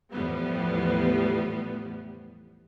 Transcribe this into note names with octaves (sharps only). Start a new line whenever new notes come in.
E2 A2 F3 G3 B3